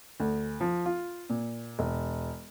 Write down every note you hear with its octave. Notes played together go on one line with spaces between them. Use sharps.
D2
F3
F4
A#2
E1